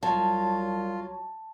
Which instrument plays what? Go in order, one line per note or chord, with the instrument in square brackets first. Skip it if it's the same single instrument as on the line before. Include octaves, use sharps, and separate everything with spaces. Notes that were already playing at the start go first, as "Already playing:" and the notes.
[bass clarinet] C2 [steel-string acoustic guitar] F#3 [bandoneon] F4 [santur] A5